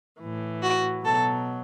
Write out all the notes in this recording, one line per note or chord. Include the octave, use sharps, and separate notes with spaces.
A2 E3
F#4
B2 F#3 A4